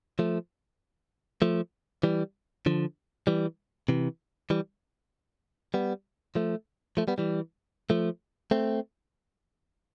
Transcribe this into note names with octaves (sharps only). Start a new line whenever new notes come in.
F3 A3
F3 A3
E3 G3
D3 F3
E3 G3
C3 E3
E3 G3
G3 B3
F3 A3
F3 A3
G3 B3
E3 G3
F3 A3
A3 C4